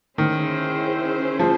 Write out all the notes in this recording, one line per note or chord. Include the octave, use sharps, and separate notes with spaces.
D#3 C#4 E4 G#4 C5
F3